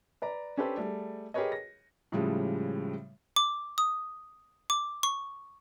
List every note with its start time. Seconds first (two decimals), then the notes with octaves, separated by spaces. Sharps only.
0.22 B4 D5 A#5
0.57 C#4 D4 G4 A4 B4 C5
0.77 G3 A3 G#4
1.34 G4 G#4 A#4 B4 C#5 D#5
1.52 A#6
2.12 A2 C#3 F3 G3 G#3
3.36 D6
3.78 D#6
4.70 D6
5.03 C#6